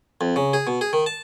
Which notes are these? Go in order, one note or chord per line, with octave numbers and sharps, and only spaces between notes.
F2
C#3
G#4
B2
G#4
D#3
A5